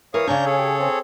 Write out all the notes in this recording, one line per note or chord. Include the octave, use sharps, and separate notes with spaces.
E3 A#4 C#5 F5 D#6
C#3 C#4 D4 G#5 A#5 G6
G#4 A4 C#5
G4
C4